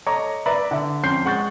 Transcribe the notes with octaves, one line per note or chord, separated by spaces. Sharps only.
A4 C#5 D#5 A#5 D6
B4 D5 E5 A#5 B5
D3 E5
F2 C#4 C6 G6 C7
G#3 F#5 C#6 G6 A6